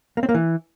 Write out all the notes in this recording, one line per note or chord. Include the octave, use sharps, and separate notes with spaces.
A#3
C4
A#3
E3